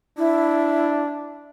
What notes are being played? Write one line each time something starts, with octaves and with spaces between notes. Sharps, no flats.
D4 E4